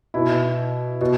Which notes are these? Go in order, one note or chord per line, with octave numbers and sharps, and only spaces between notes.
B2 E4
B2